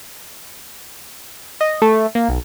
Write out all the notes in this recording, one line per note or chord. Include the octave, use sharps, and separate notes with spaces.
D#5
A3
A#3
B1